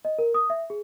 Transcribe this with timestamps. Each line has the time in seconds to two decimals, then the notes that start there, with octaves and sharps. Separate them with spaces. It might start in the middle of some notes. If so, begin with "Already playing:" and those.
0.05 D#5
0.19 A#4
0.34 D#6
0.50 E5
0.70 G#4